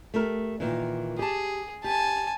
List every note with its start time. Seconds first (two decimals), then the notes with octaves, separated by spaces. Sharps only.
0.14 A3 G4 A#4
0.60 A#2 D#3 E3
1.19 G4 G#4 A5
1.84 G4 G#5 A5